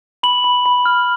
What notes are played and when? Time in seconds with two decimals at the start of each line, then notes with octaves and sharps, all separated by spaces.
0.23 B5 F#7
0.44 B5
0.66 B5
0.86 F6